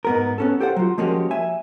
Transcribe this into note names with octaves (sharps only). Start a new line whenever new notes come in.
G#2 B3 A#4
B3 C#4 A4
G4 A4 C5 F#5
F#3 F4
F3 G#3 A#3 C#4 F#4 G4
E5 G#5